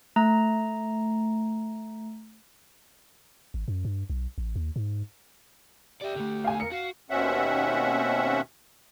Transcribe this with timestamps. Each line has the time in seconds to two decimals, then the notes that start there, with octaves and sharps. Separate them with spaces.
0.16 A3 A#5
3.54 G#1
3.68 F#2
3.85 G2
4.10 B1
4.38 A1
4.56 D#2
4.76 G#2
6.01 G4 D5 E5
6.16 D3 A3
6.44 F5 G#5
6.60 A#4 C#7
6.71 F#4 F5
7.10 D#2 B2 C4 C#4 E5 F#5